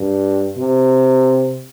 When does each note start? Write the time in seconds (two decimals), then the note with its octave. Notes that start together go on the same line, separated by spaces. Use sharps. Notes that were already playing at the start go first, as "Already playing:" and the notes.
Already playing: G2
0.57 C3